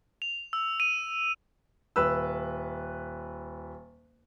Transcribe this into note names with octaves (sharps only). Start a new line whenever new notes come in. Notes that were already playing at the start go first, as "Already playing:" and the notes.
F7
E6
D#7
D#1 B4 E6